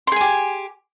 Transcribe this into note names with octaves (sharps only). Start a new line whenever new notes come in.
G4 G#4 G#5 C6